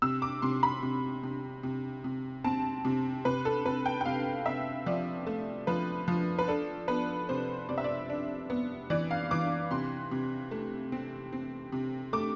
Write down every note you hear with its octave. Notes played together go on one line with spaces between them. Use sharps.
C3 E6
D6
C3 C6
B5
C3
C3
C3
C3
C4 A5
C3
C3 B4
A4
C3 B4
G5
G5
C3 F5
C3 E5
F3 D5
A3
F3 B4
F3
B4
D4 A4
B3 B4
C3 C5
C3 D5
E5
D5
D4
B3
E3 D5
F5
E3 D6
C3 C6
C3
A3
C4
C4
C3
A3 D6